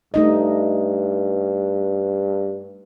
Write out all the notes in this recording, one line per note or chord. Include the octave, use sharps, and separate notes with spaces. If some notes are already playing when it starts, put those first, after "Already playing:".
G2 A3 D#4 D#5